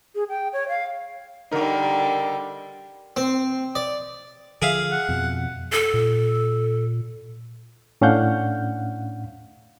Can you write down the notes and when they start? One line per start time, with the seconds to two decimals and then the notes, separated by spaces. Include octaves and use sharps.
0.15 G#4
0.29 G5
0.53 C#5
0.69 F5
1.52 D3 G3 D#4 A#4
3.16 C4
3.75 D5
4.62 D3 F3 G#4 E5 F5
4.91 F#5
5.09 F2 B2
5.72 A4
5.94 A#2
8.01 A2 C#4 D4 F5 F#5 G6